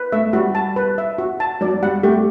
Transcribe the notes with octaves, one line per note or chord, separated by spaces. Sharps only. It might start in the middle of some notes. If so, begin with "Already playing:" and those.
Already playing: B4
A3 E5
G3 F#4
A5
B4
E5
F#4
A5
F#3 D5
G3 F#5
A3 G4